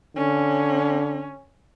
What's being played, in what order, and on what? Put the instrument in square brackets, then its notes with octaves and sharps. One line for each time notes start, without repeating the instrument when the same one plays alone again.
[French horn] D3 [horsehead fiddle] C#4